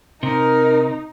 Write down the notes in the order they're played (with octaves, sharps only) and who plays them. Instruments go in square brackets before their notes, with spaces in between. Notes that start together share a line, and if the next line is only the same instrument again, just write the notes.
[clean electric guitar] C3 [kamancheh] D#4 [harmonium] A#4